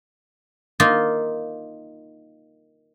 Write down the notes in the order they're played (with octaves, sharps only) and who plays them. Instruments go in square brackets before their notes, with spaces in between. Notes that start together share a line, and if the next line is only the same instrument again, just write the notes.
[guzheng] A#3 D#4 F4